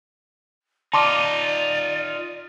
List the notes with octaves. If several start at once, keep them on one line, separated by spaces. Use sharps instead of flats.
D#4 F4 D5 A5 C6 D6